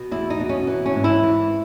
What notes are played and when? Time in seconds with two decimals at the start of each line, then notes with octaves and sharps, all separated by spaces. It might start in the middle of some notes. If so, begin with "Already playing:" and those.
Already playing: B2
0.11 E2 E4
0.30 D#4
0.40 B2
0.49 C#4
0.67 E3
0.86 C#4
0.95 G#2
1.04 E4
1.23 E3